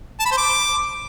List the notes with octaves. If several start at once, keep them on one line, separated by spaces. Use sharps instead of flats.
A5
B5
C5
D6